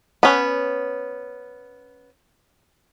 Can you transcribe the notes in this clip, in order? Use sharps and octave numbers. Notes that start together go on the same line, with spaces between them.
B3 C#4